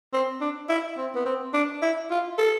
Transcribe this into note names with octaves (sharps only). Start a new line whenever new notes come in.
C4
D4
E4
C4
B3
C4
D4
E4
F4
A4